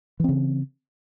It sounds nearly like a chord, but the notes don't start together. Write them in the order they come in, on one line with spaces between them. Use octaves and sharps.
E3 C4 C#3